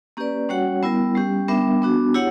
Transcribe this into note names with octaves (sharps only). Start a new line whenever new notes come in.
A#3 C#4 G4 B4 D5
G3 C#4 F#4 C#5 F#5
G3 B3 E4 A#4
G3 C#4 G4
G3 B3 D4 A#4 E5
B3 D4 F#4
E4 G4 C#5 F#5